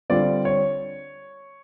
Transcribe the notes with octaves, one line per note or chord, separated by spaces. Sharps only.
D3 G3 C4 F4 D5
C#5